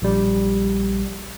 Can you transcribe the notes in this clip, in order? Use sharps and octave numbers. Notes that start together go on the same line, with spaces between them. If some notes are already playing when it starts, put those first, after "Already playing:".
A#1 G3